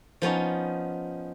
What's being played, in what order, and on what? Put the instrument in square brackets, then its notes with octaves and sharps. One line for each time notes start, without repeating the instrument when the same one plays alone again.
[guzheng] F3 B3 C#4 D#4